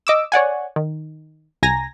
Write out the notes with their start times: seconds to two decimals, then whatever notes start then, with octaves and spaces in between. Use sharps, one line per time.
0.07 D#5 D6 E6
0.32 C#5 D5 F#5 G#5
0.76 D#3
1.63 C2 G#5 A#5 A#6